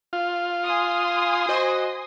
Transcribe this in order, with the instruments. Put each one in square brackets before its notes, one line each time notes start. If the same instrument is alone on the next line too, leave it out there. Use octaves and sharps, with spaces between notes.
[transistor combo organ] F4
[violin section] G#5 C6 D#6
[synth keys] F#4 C5 D#5